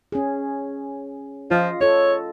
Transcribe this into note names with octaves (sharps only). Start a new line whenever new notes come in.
C#4 G#4
F3 F4 D#5
F4 A4 C#5